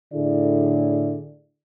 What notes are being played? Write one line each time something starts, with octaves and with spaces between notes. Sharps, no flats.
A2 D3 E4 G#4 D5